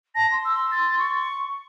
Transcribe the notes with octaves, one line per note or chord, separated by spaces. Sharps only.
A5 A#6
C6
E6
A6
C#6